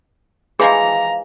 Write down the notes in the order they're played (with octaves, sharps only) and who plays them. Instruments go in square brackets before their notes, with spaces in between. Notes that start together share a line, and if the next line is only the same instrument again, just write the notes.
[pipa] E3 F3 G#3 [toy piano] G#4 [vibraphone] F5 [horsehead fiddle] A#5